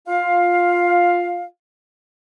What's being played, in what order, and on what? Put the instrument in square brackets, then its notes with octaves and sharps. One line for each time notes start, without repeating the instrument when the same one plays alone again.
[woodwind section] F4 F5